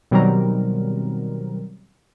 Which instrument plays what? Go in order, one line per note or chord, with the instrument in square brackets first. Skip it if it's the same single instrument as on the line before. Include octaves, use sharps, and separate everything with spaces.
[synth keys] B2 D#3 F#3 G3 C4 A#4